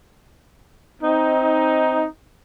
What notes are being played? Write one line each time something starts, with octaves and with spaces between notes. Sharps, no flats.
C4 D#4